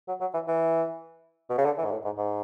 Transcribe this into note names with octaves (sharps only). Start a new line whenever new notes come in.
F#3
F#3
E3
E3
B2
C#3
D3
E3
G#2
A2
G#2
G#2